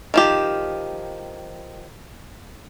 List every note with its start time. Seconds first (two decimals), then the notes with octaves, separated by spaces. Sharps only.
0.14 D#3 F3 G4